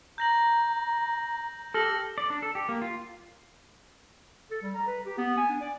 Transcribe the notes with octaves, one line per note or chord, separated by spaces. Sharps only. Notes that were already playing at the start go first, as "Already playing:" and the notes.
A#5 G6 A#6 F#7
G4 A4 F6 A#6 F#7
D5
D4
A4
G4
A#3
F4
A4
G3
A#5
B4
G4
B3
G#5
D4
D5